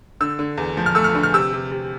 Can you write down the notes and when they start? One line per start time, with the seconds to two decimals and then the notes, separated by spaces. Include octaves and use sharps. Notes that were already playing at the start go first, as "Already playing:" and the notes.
0.21 D3 E6
0.39 D3
0.57 E2
0.77 F3
0.86 F6
0.95 A3 E6
1.04 F6
1.15 D3
1.23 F6
1.34 C3 E6
1.53 C3
1.71 C3